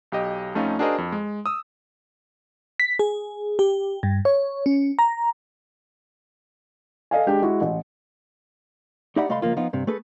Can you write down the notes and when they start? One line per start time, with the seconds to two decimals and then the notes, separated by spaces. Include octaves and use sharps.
0.12 B1 G4 D#5
0.55 F2 A3 C#4 D#4 F4
0.79 D4 F#4 G#4 A#4 C5 D#5
0.98 F2
1.12 G#3
1.46 D#6 E6
2.80 B6
2.99 G#4
3.59 G4
4.03 G2
4.25 C#5
4.66 C#4
4.99 A#5
7.11 A4 D#5 F5 G#5
7.27 G#3 D4 G4
7.42 G#3 E4 F#4
7.61 A1
9.16 D#4 G4 D5 E5 F#5 B5
9.29 C2 A3 D#5 F5 B5 C6
9.42 C#2 F3 A#3 F4
9.57 F3 B3 D#4 F4
9.73 G2 C3
9.87 A3 G#4 A4 B4